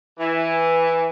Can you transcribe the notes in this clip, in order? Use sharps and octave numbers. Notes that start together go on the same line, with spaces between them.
E3